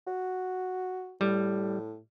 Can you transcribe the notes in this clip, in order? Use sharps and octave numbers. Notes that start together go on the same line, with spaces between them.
F#4
A2 G3